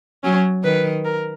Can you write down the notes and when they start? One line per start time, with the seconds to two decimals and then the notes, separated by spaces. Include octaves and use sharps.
0.24 F#3 C#4
0.64 D#3 B4
1.05 A#4